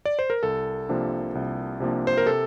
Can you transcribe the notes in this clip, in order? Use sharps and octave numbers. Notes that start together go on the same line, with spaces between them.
D5
C5
A#4
C2 A4
C3 F3 A#3 D4
C2
C3 F3 A#3 D4
C5
A#4
C3 A4